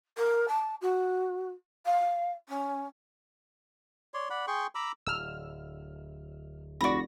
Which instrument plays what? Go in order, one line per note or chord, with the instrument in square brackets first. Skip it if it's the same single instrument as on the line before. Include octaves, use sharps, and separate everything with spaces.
[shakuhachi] A#4
A5
F#4
F5
C#4
[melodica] C#5 D5 C6
D5 F#5 B5
G#4 G5 C6 C#6
A#5 B5 D6 E6
[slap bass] D1 [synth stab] E6 F6
[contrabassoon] F1 [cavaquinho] F#4 B5 [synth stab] D5 A#6